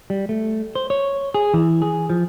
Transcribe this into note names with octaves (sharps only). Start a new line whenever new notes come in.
G3
A3
C5
C#5
G#4
E3
G#4
F3